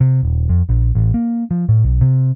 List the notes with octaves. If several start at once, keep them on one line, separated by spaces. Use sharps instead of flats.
C3
D#1
F2
A#1
A1
A#3
F3
A2
B1
C3